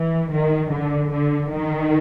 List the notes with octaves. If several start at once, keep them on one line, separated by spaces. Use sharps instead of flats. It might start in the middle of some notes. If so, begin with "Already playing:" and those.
Already playing: E3
D#3
D3
D3
D#3